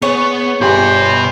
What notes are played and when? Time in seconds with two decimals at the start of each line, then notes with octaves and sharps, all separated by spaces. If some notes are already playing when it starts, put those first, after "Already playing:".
0.02 B3 G#4 C#5
0.61 G1 B2 G4 C5 G#5 B5